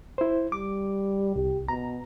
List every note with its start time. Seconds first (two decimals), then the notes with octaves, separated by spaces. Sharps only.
0.18 E4 C5
0.52 G3 D6
1.36 C2 G4
1.69 B2 A#5